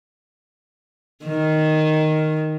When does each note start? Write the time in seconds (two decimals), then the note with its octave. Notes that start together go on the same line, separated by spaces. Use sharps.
1.25 D#3